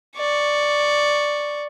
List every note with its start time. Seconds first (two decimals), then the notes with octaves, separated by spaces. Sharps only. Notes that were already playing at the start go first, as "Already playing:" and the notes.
0.18 D5 C#6